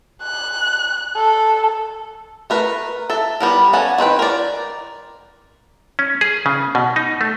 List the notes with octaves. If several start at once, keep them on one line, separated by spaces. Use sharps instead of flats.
F#6
A4
A3 A#4 B4
A4 E5
G3 B3 A#4
C#4 A4 F#5 G#5
D#3 C4 B4 G5
A#4 D5
C#4
G#4
C#3
B2
D#4
A3